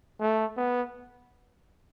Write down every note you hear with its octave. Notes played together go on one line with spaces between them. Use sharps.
A3
B3